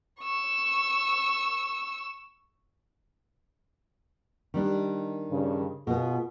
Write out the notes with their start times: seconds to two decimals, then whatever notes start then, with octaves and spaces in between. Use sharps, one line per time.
0.21 C#6 E6
4.54 D#3 G3 D4
5.31 G2 C#3
5.87 B2 B3 F4 G#4